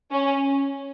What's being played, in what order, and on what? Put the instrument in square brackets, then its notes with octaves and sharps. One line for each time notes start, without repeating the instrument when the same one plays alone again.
[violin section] C#4